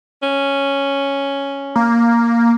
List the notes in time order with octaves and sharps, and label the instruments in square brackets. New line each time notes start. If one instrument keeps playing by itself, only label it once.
[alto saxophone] C#4
[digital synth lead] A#3